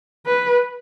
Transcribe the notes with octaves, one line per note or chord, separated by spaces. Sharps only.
B4